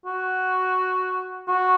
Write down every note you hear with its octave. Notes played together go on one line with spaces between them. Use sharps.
F#4
F#4